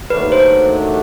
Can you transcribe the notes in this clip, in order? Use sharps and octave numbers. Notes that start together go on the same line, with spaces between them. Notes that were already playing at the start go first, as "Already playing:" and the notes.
D#2 D#3 F#3 A3 D4 B4
C5